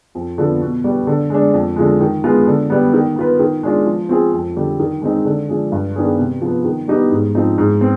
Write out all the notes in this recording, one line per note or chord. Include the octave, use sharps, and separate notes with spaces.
F2
D3 F3 B3
B2
G3 B3
D3
G#3 D4
F2
D3 F3 G#3
D#3
G#3 B3 F4
D3
G3 B3
D#3
B3 F4 B4
D#3
G#3 D4 F4
F3
C4 F4 G#4
F2
D3 G3
D#3
G#3 C4 D#4
D3
F3 G#3 D4 G#4
G2
D#3 B3 D4 G#4
C3
F3 B3
D#3
G3 B3 D#4 G4
G#2
F3 C4 D#4
G#2
C4